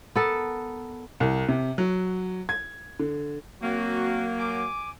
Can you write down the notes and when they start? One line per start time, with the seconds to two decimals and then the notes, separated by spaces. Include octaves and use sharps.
0.15 B3 A4 A#4
1.20 C2
1.49 C3
1.78 F#3
2.49 G#6
3.00 D3
3.62 F#3 A#3 C4 F#4
4.39 G#5 D6